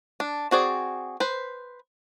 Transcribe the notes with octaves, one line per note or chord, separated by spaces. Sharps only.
D4
C4 F#4 G#4 D5
B4 C5